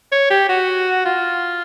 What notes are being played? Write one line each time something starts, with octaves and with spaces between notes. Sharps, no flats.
C#5
G4
F#4
F4